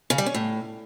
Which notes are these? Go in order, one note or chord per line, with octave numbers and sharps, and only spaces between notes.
C#3
G3
C#4
A2